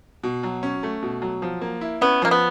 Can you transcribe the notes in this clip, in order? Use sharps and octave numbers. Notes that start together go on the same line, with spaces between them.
B2
F#3
C#4
A3
B2
F#3
F3
A#3
E4
B3 C#4
F3 A#3
B3